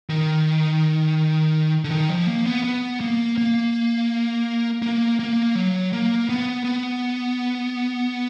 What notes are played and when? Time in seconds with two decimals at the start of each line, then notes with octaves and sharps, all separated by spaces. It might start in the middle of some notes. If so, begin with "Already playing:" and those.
0.10 D#3
1.85 D3
1.91 D#3
2.09 F3
2.27 A#3
2.45 B3
2.64 B3
3.01 A#3
3.38 A#3
4.82 A#3
5.19 A#3
5.55 F#3
5.93 A#3
6.29 B3
6.65 B3